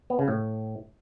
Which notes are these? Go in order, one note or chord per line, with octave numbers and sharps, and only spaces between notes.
B3
C#3
A2